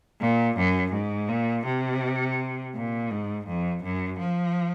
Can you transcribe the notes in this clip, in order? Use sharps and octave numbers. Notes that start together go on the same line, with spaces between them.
A#2
F#2
G#2
A#2
C3
A#2
G#2
F2
F#2
F3